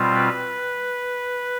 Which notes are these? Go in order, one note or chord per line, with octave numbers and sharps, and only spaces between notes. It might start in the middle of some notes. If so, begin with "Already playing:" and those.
Already playing: B2 G3 C4 F4
B4